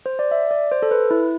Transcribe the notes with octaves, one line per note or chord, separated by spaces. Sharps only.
C5
D5
E5
D5
C5
A4
B4
E4